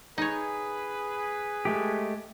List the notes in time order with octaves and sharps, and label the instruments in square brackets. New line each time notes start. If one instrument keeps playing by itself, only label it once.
[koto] D#4 C#5 [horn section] G#4 B4
[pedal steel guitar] G#3 A3 G4